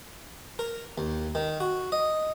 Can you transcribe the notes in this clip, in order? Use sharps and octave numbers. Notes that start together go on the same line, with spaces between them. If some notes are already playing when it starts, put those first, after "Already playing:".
A#4
D#2
D#3
F#4
D#5